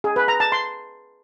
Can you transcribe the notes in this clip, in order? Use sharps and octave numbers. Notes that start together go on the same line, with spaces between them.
G#4
B4
A#5
A5
C6